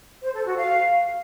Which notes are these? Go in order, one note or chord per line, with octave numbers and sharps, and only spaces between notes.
C5
A4
F#4
F5